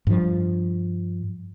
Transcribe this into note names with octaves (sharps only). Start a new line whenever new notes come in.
G2 F3